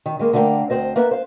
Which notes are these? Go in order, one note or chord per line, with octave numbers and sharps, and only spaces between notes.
D#3
D#3 G#3 A#3
D3 A3 A#3 B4 F5 G5
D2 G2 C4 C5 D#5
A#3 B3 B4 E5
C5 F5